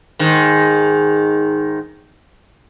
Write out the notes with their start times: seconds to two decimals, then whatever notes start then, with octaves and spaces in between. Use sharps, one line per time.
0.19 G#2 D#3